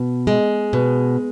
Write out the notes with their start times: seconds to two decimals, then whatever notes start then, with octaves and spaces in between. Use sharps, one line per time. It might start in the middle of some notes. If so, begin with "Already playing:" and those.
Already playing: B2
0.27 G#3
0.73 B2